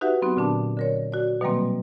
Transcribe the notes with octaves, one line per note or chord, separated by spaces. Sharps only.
D#4 F#4 G4 B4 E5 F#5
F#3 B3 C4 D#4 F#4
A#2 D3 D4 A5
D3 A#4 C#5
F#4 D5
B2 D#3 F#3 G3 A#3 C4